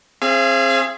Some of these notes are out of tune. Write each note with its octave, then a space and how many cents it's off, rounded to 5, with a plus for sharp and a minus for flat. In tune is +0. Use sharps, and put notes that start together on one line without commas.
C4 +30 G#4 +0 F5 -40